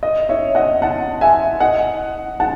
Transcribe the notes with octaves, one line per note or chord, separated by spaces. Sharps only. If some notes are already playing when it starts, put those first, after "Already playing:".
D#5
C#5 E5
D#5 F#5
F#5 A5
E5 G#5
D#5 F#5
F#5 A5